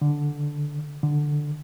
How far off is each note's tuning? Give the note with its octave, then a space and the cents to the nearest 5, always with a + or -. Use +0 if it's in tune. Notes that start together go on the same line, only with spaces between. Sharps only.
D3 -5
D3 +5